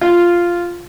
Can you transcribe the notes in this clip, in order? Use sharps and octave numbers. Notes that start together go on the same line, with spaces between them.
F4